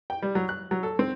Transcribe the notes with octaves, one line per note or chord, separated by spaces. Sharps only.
G5
G3
F#3
F#6
F#3
A4
C4